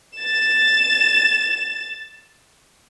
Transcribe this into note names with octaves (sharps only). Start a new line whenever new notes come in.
A6 E7